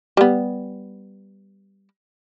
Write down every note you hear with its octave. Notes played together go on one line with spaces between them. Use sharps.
G3 B3